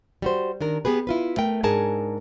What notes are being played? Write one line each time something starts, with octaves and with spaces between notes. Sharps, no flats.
G3 F#4 C5
D#3 D4 A#4
B3 G4 G#4 B4
E4 F4 B4
A3 A#4 G5
G#2 D4 G#4 A#4 G#5 A5